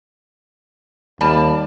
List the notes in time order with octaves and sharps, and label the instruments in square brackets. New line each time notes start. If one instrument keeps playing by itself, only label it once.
[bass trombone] D#2 [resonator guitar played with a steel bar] G3 D5 A5